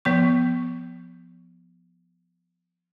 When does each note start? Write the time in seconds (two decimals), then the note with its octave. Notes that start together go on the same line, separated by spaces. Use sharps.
0.05 F3 B3 C#6